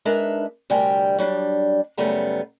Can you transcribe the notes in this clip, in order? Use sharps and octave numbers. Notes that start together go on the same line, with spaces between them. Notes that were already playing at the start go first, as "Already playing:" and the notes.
G#3 D4 D#4 A#4 B4 E5
D2 C3 G3 A#4 G5 G#5
F#3 G3 D4
F#2 C#3 G3 A3 B3 A#5